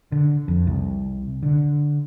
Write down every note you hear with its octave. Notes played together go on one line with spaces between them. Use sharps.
D3
F2
C2
D3